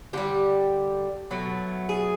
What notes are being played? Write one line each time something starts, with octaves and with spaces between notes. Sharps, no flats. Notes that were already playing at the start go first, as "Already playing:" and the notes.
D3 G3 G4
B2 F#3 A3
G#4